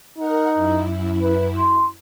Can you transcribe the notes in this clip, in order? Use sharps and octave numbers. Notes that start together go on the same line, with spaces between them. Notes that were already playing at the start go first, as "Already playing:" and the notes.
D#4 A#4 F#5
F#2 E4
B4
C6